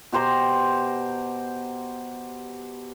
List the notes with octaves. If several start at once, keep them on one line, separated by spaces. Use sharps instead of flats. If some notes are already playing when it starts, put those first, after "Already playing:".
B2 G4 C5 A#5